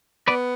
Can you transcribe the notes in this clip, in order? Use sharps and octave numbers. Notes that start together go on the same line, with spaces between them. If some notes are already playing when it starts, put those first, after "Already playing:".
B3 B4 D5